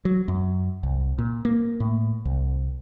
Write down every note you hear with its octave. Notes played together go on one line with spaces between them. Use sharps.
F#3
F#2
C2
A#2
A#3
A2
C2